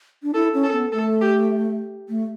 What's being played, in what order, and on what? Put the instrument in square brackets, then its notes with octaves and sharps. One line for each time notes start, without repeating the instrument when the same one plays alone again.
[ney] D4
[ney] E4 [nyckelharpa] A4
[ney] C#4
[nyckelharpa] A4
[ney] B3
[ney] A3 [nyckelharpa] A4
[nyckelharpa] G4
[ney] A3